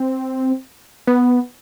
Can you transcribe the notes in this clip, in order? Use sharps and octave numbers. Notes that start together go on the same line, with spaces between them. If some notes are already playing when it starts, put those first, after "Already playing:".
Already playing: C4
B3